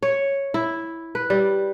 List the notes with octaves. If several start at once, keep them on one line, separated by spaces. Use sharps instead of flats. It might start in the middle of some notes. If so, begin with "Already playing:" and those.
C#5
E4
B4
G3